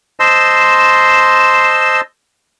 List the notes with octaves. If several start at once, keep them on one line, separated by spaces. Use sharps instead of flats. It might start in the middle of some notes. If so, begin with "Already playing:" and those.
C5 D#5 A5 C6 E6